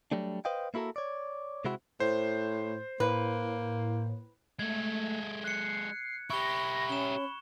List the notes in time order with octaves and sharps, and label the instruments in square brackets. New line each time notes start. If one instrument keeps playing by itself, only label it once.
[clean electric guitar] F#3 G3 A3 D4
B4 C5 D#5 F5 G5
A#3 E4 F#4 A4 A#4
C#5 D5
C3 G#3 C4 E4 F#4
[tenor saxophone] A2 [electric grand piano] C5
[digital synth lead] A2 [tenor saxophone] A#3 [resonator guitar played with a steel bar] B4
[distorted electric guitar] G#3 A4 [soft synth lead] A3 [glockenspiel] G#6
[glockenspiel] F#6 C#7 [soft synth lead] C7
[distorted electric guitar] E4 G4 [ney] B5 [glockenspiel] C#6 G7 [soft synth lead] A#6
[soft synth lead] C#4 [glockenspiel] E7 G7